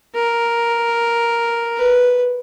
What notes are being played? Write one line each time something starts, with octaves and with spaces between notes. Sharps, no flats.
A#4
B4